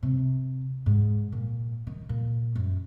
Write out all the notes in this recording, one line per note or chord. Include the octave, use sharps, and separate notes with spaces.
C3
G#2
A#2
D#3
A#2
F#2